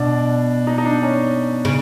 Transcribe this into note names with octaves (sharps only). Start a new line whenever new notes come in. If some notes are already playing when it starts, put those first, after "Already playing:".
Already playing: B2 D4
D#4
D#4
D4
C#4
C#3